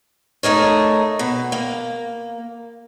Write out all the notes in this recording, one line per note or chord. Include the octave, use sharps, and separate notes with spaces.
A3 D#4 A#4 C#5
B2
A#3